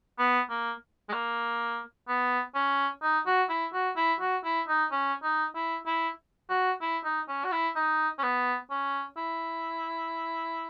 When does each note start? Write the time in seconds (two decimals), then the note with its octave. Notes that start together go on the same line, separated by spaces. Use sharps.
0.18 B3
0.50 A#3
1.09 G#3
1.13 A#3
2.08 B3
2.55 C#4
3.02 D#4
3.26 F#4
3.49 E4
3.73 F#4
3.97 E4
4.20 F#4
4.44 E4
4.68 D#4
4.91 C#4
5.23 D#4
5.55 E4
5.86 E4
6.49 F#4
6.81 E4
7.04 D#4
7.28 C#4
7.44 F#4
7.52 E4
7.75 D#4
8.19 C#4
8.23 B3
8.70 C#4
9.17 E4